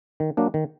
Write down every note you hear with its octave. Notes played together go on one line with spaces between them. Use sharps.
D#3
F#3 A#3 D4
D#3